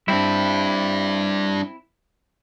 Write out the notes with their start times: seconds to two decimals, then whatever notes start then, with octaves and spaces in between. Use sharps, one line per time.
0.08 G3 C4 D4 E4